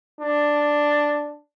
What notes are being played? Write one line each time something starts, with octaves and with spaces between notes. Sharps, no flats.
D4